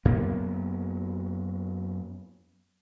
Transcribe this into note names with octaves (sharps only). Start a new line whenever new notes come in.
F#2 A#3 B3